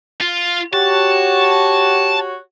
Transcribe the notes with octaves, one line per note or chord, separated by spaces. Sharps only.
F4
F#4 G4 C#5 A5